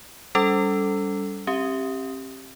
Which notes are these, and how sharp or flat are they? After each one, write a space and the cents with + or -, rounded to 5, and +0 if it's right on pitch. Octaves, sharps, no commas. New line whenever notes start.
G3 +0 C#4 +40 A4 +0
C4 +40 G4 -5 E5 +0